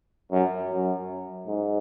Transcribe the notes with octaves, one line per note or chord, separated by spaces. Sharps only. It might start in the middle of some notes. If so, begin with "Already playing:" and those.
F#2
F#2
G#2